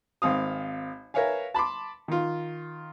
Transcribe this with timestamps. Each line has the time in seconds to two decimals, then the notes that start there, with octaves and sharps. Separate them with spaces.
0.22 G#1 C4 F5 D#6
1.14 A#4 B4 C#5 E5 F5 G#5
1.54 A5 B5 C6 D6
2.08 D#3 F4